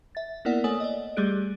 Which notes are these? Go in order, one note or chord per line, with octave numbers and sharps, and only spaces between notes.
E5 A6
A#3 B3 E4 A#4 D5 F#5
A3 A4 C#5 G#5 D#6 F#7
D5 D#5
G3 A3 G4 G#4 F#6 D7